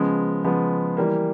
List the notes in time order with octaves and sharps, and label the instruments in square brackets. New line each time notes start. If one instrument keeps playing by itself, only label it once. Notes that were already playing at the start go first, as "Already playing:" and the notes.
Already playing: [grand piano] C#3 F3 G#3 B3
C#3 F3 G#3 B3
E3 G3 A#3